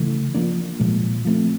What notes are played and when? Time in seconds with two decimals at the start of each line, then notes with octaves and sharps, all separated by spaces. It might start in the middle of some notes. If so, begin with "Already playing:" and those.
Already playing: C#3 E3 A3
0.34 F3 A#3 D4
0.79 A#2 F3 G#3
1.25 F3 A3 C4